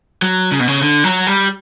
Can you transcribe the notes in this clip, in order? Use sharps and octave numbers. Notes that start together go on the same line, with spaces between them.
F#3
C#3
B2
C#3
D3
F#3
G3